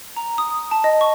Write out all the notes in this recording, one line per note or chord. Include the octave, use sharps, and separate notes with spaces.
A#5
D#6
A5
D#5
C#6